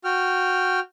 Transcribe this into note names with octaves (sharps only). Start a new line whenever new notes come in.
F#4 G5 F6